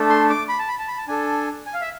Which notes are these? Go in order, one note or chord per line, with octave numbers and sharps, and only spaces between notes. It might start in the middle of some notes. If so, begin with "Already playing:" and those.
Already playing: A3 D4 A4
C6
D6
B5
A5
B5
A5
B5
A5
D4 A4 G#5
G#5
F5
E5